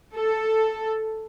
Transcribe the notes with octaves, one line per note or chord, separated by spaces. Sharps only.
A4